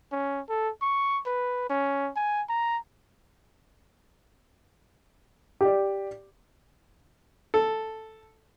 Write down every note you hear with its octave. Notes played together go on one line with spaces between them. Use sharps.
C#4
A4
C#6
B4
C#4
G#5
A#5
G4 D5
A4